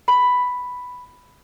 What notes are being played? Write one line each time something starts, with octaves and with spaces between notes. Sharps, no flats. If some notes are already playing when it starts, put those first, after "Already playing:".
B5